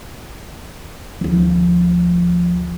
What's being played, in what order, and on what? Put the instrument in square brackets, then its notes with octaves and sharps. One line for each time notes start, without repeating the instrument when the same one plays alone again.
[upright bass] D2 F3